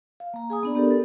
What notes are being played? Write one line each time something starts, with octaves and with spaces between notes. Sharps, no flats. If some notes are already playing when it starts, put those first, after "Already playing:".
F5
A#3 A#5
G#4 G#5 D#6
B3 D4 D5
B3 G4 A4 A#4
A4